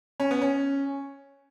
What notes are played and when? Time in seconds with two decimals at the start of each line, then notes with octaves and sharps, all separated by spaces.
0.20 C#4
0.31 B3
0.42 C#4